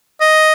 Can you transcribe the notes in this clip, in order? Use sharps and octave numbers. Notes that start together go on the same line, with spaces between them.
D#5